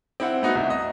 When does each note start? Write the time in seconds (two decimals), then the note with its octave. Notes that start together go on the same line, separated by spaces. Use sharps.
0.20 C4 E4 F#5
0.42 A3 B3 D#4 F#4
0.55 C2
0.70 D#5